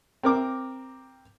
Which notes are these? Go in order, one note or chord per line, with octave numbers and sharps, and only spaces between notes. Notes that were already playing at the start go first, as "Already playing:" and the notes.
C4 A#4 D6